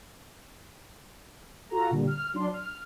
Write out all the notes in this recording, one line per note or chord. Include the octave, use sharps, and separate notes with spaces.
F4 F#4 A4 A#5
A#2 D3 G3
F6
F#3 D4 C6
F6